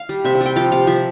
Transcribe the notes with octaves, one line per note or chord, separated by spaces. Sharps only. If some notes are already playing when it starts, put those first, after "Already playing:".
Already playing: F5
G3
C3 E5
E5
G3 G5
F3 F5
C3 F5
F3 E5